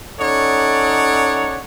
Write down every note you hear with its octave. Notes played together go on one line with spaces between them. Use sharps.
C#4 D#4 A4 C#5 D5 F#5